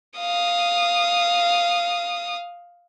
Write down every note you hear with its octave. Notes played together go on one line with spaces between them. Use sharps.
F5 D#6